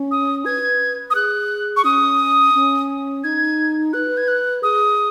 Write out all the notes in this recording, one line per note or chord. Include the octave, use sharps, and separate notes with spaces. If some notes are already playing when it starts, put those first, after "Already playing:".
Already playing: C#4
D#6
B4 G#6
D#6
G#4 F#6
C#6
C#4 D#6
C#4
D#4 G#6
B4 F#6
G#6
F#6
G#4 D#6